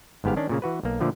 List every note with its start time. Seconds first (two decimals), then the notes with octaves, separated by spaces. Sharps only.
0.24 G1 G#2 B3 G4 F5
0.36 D#3 C#4 D4
0.49 A#2 C#3 A#3
0.62 E3 F#4 B4
0.83 B1 A#3
1.00 A#2 D3 F3 A3